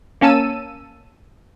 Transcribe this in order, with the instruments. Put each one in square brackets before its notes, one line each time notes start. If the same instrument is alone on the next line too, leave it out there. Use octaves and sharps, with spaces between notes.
[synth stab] A#3 C#4 A5 E6 D#7